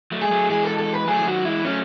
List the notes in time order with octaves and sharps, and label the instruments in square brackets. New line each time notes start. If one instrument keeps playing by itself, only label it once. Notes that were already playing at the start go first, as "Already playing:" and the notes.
[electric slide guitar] F#3 A3
[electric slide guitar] G#3 [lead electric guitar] G#4
[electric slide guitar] F#3 A3
[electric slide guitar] E3 G#3 [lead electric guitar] G#4
[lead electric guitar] A4
A4
B4
[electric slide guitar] F#3 A3 [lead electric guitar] G#4
[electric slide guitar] E3
[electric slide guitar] D#3 F#3 [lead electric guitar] F#4
[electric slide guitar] E3 G#3 [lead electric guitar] E4
[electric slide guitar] F#3 A3 [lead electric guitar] C#4